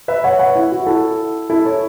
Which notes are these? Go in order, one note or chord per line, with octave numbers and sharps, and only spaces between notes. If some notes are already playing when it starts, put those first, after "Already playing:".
B4 E5
C#5 F#5
C#5 F#5
E4
F#4
E4 A4
E4 A4
A4 C#5